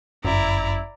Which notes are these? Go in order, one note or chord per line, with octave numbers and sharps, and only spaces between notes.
G1 F#2 E4 D5 A#5